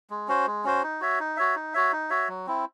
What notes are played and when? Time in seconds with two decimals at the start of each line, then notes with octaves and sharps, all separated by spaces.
0.10 G#3
0.28 C#4 F#4 C5
0.47 G#3
0.64 C#4 F#4 C5
0.83 D#4
1.01 F#4 C#5 E5
1.20 D#4
1.37 F#4 C#5 E5
1.56 D#4
1.74 F#4 C#5 E5
1.92 D#4
2.10 F#4 C#5 E5
2.28 F#3
2.47 C4 E4